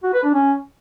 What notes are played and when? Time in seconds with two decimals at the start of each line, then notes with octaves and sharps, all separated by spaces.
0.03 F#4
0.14 B4
0.24 D4
0.34 C#4